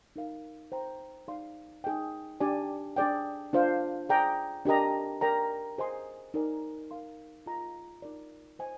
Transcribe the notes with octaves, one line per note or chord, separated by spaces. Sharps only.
D#4 A#4 F5
C5 G5 A#5
D#4 G#4 D5 F5 C6
D#4 G#4 D#5 G5
D4 G4 D5 G#5
D4 G#4 D5 G5
D4 F4 C5 F5
G#4 D5 G5 A#5
D4 G4 A#4 D#5 A#5
A#4 D5 G5 A#5
G#4 C5 D#5 G#5 C6
D#4 A#4 D5 G#5
A#4 F5 C6
F4 G#4 D#5 A#5
D#4 A#4 D5
C5 D#5 G#5